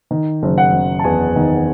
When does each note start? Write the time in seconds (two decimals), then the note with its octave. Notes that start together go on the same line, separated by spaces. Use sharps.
0.11 D#3
0.43 F#1
0.58 F#5
0.73 F#1
0.99 A5
1.04 E2 G#5
1.36 D#3